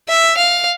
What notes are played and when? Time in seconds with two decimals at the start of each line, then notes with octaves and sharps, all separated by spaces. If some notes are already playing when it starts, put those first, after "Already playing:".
0.09 E5
0.37 F5